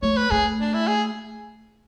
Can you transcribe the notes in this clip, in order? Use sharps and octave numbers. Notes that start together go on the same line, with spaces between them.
A3 C#5
B4
A3 G#4
D4
E4
G#4